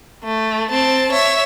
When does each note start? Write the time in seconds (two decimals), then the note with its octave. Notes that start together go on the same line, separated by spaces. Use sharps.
0.24 A3
0.71 C4 A5
1.12 C#5 E5